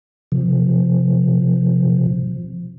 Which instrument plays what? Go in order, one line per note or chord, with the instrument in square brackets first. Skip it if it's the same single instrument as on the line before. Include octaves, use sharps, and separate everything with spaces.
[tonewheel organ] C3 F3